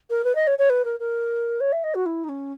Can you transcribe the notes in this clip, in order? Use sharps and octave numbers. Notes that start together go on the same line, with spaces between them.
A#4
B4
D#5
C#5
C#5
B4
A#4
A#4
C#5
E5
D#5
F#4
E4
D#4
C#4